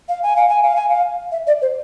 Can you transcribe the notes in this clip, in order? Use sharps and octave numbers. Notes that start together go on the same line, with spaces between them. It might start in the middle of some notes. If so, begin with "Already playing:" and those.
F5
G#5
F5
G#5
F5
G#5
F5
E5
D5
C5